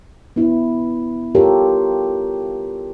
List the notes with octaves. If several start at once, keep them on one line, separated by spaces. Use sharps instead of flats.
B3 E4
F4 G4 A4 A#4 C#5